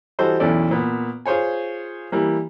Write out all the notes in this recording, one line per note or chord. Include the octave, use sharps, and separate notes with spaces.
E3 G3 F#4 A4 C5 D#5
B1 E2 C#4 E4 A4 D5
A#2 B3
F4 G#4 C5 C#5 G#5
E3 G3 A#3